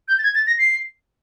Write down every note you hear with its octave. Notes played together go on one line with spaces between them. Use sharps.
G6
A6
G#6
A6
A#6
C7